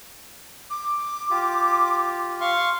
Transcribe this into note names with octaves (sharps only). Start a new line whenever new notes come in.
D6
F4 G4
F5 C6 C#6